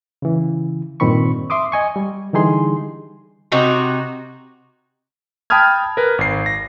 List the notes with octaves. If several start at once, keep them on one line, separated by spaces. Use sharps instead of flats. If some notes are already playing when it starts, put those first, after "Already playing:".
C#3 E3
G2 A#2 D#3 C4 B5 C#6
E5 C6 D6 D#6
D#5 G#5 C#6
G3
D3 E3 G3 D#4 G#4 C6
C3 D#4 F#4 A#5
G5 A5 B5 D#6 F6 G#6
A#4 B4
G#1 C7
A#6